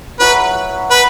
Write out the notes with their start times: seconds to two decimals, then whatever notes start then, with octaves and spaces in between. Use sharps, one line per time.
0.20 F#3 E4 B4 C#5
0.91 B4